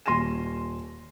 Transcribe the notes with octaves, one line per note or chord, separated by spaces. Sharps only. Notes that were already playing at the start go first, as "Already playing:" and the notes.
D#1 C6 A#6 D#7 E7